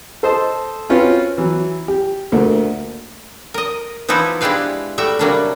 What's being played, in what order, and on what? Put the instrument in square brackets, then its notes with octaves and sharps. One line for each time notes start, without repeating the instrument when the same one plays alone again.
[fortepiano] A4 C5 D#5 A5
C4 C#4 F4 F#4 B4 C#5
E3 F#3
G4
D2 A#2 A3 A#3
[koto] A#4 D#5
E3 F3 B3 D#4 E4
G#3 D4 E4 G4 B4 F5
G3 A3 F#4 E5 G5
C3 F#3 G3 A#3 C#4 D4